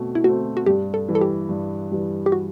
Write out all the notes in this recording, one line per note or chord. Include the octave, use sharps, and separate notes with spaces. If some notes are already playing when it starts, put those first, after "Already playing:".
Already playing: B2 A3 C4
E4
A3 C4 F#4
F#4
G2 G4
A4
E3 G3
A4
G4
G2
E3 G3
G4
F#4